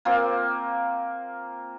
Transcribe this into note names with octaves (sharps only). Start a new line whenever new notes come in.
A#3 C4 F4